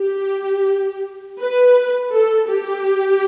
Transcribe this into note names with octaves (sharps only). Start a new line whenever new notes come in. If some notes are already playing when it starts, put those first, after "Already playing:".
Already playing: G4
B4
A4
G4